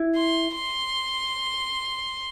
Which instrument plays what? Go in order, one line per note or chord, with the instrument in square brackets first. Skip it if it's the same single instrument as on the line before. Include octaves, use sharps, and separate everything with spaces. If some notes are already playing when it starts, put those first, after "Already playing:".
Already playing: [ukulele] E4
[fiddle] C6
C6